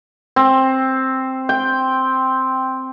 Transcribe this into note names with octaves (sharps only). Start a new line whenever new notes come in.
C4
G5